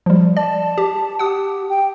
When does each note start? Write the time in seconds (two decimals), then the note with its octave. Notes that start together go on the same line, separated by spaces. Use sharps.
0.06 F3 G3
0.37 D5 A5
0.78 G4
1.19 G4 F#5 D#6
1.69 G5